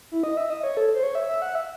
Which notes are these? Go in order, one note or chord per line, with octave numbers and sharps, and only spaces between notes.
E4
D#5
E5
D#5
C#5
A4
C5
C#5
E5
E5
F#5
E5